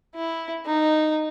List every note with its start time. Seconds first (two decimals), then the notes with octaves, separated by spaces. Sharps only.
0.15 E4
0.65 D#4